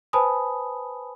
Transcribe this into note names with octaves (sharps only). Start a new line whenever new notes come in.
B4 C5 G#5 A5 B5 D#6